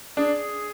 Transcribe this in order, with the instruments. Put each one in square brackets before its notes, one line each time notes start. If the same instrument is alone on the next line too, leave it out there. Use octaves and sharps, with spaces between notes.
[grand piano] D4 [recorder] G#4